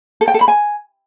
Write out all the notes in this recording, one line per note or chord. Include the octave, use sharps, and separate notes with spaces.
A4
G5
A4
B5
G#5